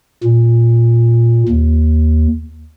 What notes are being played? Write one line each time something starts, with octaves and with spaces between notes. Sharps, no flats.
A#2
D#2